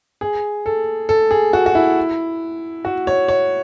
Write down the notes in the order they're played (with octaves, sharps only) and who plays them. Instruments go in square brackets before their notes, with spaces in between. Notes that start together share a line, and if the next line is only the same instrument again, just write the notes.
[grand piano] G#4
A4
A4
G#4
F#4
F#4
E4
F#4
C#5
C#5